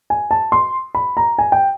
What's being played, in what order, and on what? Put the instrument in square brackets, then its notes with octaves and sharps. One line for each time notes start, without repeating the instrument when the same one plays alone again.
[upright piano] G#5
A5
C6
B5
A#5
G#5
G5